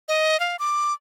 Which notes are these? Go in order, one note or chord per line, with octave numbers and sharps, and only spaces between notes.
D#5
F5
D6